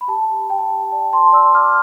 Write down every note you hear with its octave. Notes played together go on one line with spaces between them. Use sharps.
B5
G4 A5
G4 G5
A5
G5
D5 A5
A5 C6
D5 C6 E6
D6 F6